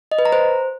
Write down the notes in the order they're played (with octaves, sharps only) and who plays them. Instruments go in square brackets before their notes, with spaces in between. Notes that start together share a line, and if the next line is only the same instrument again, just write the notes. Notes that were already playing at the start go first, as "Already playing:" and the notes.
[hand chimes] D#5
B4
A#5
C5